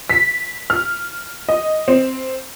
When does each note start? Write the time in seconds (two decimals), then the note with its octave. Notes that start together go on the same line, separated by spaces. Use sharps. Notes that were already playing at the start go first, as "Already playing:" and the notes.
0.10 B6
0.70 F6
1.49 D#5
1.88 C4